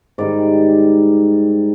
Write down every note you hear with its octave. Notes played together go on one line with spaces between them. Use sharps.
G#2 D#3 G3 D5